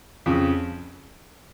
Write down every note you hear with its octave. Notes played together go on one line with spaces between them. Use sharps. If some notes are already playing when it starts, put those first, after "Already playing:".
F2 C#3